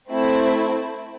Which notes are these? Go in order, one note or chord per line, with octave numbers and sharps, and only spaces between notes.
A3 C4 E4